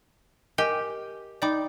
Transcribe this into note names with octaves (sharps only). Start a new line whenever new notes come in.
G4 A#4 D#5 G#5
D#4 D5 G5 B5 D6